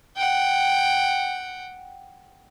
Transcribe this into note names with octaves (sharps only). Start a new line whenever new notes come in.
F#5 G5